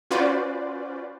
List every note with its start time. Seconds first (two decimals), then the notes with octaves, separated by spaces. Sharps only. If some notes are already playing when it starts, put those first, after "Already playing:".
0.11 C#4 F4 F#4 B4 C5 D5